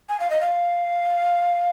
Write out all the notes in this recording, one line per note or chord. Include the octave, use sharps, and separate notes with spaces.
G#5
F5
D#5
F5